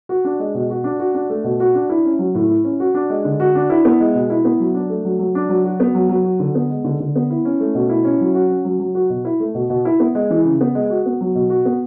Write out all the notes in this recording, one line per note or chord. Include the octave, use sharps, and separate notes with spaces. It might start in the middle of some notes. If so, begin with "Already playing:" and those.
F#4
D4
G#3
B2
F#4
D4
F#4
D4
A3
B2
F#4
D4
E4
C#4
F#3
A2
E4
C#4
F#4
D4
G#3
D3
F#4
D4
E4
B3
G#3
B2
E4
B3
F#3
D4
A3
F#3
F#3
D4
F#3
F#4
B3
F#3
F#3
F#4
D3
B3
G#3
D3
D3
B3
E4
C#4
A3
B2
E4
C#4
F#3
F#4
C#4
F#3
F#3
F#4
B2
E4
A3
B2
B2
E4
B3
G#3
E3
C#3
B3
G#3
F#4
B3
F#3
B2
F#4
B3